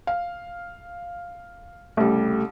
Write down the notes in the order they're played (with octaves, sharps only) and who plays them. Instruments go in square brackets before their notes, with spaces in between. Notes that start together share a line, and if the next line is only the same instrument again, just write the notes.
[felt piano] F5
[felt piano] C2 C#3 G3 [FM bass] A3